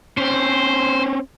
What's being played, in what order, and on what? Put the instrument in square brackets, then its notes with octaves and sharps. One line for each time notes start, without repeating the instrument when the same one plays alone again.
[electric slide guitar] C4 C#4 [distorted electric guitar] C5